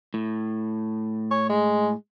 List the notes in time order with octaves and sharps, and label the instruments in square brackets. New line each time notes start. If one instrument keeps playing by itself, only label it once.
[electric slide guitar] A2
[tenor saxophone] C#5
G#3